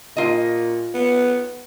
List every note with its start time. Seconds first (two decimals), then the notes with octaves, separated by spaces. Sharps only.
0.17 A#2 F4 D#5
0.94 B3